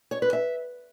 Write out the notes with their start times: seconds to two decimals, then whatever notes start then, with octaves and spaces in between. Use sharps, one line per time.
0.11 C#5
0.22 B4
0.33 E5